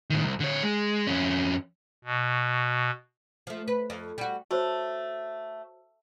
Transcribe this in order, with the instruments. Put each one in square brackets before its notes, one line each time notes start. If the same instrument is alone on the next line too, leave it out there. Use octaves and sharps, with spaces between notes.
[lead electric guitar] A2 D#3
C2
D3 C#5
G#3
F2 C#4
[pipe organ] B2
[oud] F3 A3
B4
F2
G3 F#4
[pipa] A3 [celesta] F#4 C5 C#5